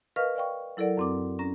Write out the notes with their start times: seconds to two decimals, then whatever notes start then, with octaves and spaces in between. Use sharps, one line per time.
0.16 A#4 B4 D#5 F5 C#6 F6
0.35 D5 F5 G5 C#6
0.77 F#3 E4 A4 A#4 D5 F#5
0.97 F#2 C4 D6
1.39 C#4 A#5 A#6